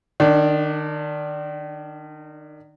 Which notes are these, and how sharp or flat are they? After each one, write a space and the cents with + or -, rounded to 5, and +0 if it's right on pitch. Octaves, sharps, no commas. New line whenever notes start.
D#3 -25 D4 +0